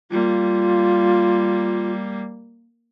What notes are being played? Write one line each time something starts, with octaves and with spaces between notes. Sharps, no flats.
G3 A#3 F4